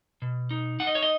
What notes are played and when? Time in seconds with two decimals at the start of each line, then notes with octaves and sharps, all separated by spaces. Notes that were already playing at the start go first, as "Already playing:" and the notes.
0.22 B2
0.51 D#4
0.80 D#4 F#5
0.87 D#5
0.95 C#5
1.02 D#5